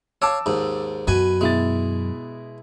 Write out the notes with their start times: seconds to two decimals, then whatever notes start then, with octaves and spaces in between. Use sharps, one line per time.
0.22 C#5 F5 A5 D6 E6
0.46 D#2 G#2
1.07 F#2 B2 B4 G#5
1.41 B2 G#3 E4 A6